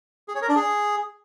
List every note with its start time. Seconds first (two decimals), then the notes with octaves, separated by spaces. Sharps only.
0.28 G#4
0.35 C#5
0.42 A#4
0.49 D4
0.56 G#4